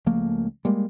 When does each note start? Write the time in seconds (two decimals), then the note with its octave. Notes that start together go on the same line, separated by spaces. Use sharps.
0.06 C#2 F3 A3 A#3
0.65 G3 G#3 A#3